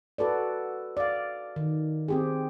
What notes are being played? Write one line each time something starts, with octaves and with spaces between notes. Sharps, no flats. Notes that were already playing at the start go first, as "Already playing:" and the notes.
F#4 A4 B4 D5
D5 F5
D#3
C4 G4 G#4